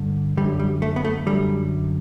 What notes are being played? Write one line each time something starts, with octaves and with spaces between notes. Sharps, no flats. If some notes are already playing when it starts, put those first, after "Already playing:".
Already playing: G2 D3
F#2 D3 G3
G3
A3
B3
A3
F#2 D3 G3